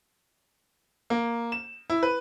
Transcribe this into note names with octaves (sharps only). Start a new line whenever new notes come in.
A#3
E7
E4
B4